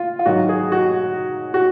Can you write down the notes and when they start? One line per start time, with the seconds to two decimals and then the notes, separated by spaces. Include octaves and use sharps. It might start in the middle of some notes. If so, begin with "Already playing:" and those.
Already playing: F4
0.19 F4
0.26 G#2 D#3 F#3 F#4
0.49 G#4
0.72 F#4
1.54 F#4